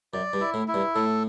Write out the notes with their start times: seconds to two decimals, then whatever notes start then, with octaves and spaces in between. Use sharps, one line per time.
0.13 F#2 D5
0.34 G2
0.41 E4
0.54 A2
0.68 E4
0.74 G2
0.95 A2 A4